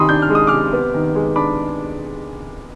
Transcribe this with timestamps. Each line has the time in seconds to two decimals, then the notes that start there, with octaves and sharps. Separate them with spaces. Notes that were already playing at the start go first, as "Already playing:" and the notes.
Already playing: C3 D#3 B5 C6 D#6
0.09 D4 G6
0.22 F6
0.30 G#3
0.35 D#6
0.47 C3 D6 F6
0.73 B3
0.94 D#3
1.15 G#3
1.36 D4 B5 D6